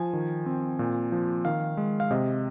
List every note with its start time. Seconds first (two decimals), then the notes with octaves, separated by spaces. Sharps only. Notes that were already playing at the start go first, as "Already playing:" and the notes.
Already playing: F3 G#5
0.13 D#3
0.46 C4
0.79 A#2
1.12 F3
1.45 D#3 F5
1.77 G#3
2.00 F5
2.11 C3 D#5